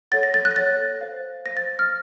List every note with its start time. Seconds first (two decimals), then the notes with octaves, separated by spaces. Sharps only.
0.11 A4 C#5 F#5 A6
0.23 A#6
0.34 A6
0.45 F#6
0.51 A#6
0.56 A4 C#5 F#5 A6
1.01 C5 F5
1.46 C5 F5 A#6
1.57 A6
1.79 F6